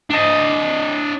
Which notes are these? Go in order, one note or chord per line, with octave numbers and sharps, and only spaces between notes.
D4 D#5